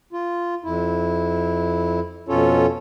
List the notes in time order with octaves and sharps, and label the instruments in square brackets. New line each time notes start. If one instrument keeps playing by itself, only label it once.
[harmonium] F4
F2 E4
F2 B2 C#4 F4 A4 C#5